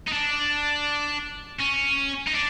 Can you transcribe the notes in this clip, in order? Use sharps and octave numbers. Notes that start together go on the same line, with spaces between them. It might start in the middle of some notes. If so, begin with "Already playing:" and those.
D#4
D4
C#4
D#4
D4